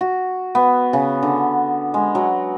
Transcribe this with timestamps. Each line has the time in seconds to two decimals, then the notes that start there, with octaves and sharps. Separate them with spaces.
0.01 F#4
0.55 B3
0.93 C#3
1.23 D3
1.94 G#3
2.15 F#3